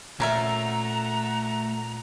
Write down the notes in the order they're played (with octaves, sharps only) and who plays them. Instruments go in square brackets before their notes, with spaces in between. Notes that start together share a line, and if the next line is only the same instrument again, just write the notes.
[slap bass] A#2 [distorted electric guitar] A3 [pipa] C#4 A#4 E5 [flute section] F#5 A#5